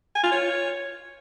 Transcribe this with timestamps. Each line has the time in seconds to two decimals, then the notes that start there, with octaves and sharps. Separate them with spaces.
0.15 G#5
0.24 F4
0.32 C#5